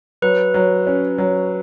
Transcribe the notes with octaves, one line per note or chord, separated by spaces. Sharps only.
F#3 B4
F#3
C#4
F#3